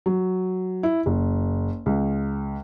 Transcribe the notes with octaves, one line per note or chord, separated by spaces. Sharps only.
F#3
E4
F#1
C#2